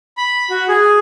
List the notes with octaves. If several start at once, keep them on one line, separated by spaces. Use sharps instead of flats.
B5
F#4
G#4